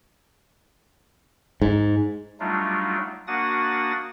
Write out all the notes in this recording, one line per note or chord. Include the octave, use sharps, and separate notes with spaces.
G#2
F#3 G3 A3 D4 D#4 F4
A#3 D4 F#4 F#5 D#6 A6